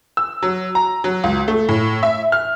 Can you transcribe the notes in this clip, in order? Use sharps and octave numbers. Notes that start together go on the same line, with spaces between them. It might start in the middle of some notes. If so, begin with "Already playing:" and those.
E6
F#3
A#5
F#3
C#2
A3
A2
E5
F6